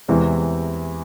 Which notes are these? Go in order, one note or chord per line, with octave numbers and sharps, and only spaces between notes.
E2 C3 E3 G#3